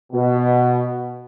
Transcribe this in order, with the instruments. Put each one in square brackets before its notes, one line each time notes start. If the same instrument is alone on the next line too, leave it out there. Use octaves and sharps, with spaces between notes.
[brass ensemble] B2